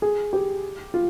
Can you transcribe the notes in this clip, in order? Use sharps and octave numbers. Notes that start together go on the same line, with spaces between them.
G#4
G4
F4